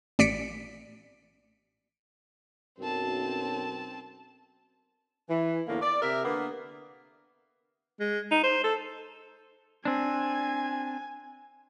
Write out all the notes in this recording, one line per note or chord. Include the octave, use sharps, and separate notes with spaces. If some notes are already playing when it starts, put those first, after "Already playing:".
A1 D5 B6 C#7 D7
B1 F#2 C4 A5
E3
E2 A2 D3 A#3
D5
C3 A#4 E5
D3 A#3 B3
G#3
D#4
C5
A4
C4 D4 G#5